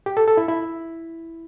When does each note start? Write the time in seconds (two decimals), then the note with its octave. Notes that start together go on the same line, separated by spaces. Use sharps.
0.06 G4
0.17 A4
0.28 A4
0.37 E4
0.48 E4